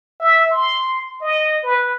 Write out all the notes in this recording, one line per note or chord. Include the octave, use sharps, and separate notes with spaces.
E5
C6
D#5
B4